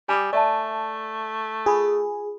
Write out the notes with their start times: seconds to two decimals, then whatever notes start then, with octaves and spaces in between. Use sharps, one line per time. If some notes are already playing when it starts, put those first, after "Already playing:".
0.09 G3 G#5 D6 D#6
0.33 A3 D5 E5 A5
1.66 F4 G#4 B5